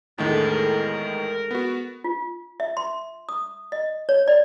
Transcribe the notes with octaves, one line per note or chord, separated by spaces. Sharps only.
E2 A2 D#3 G#3 A3 D4 A4
A#4
B3 F#4
F4
E5
C6
D#6
D#5
C#5
D5